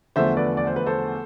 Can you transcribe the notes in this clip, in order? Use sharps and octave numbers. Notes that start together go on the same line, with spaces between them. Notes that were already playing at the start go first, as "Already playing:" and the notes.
E2 D3 F3 A3 C5 E5
B4 D5
D5
C5
B4
A4 C5